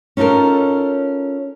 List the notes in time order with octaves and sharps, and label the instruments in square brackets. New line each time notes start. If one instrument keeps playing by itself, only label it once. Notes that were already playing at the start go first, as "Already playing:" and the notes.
[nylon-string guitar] C#4 D#4 F4 A4 A#4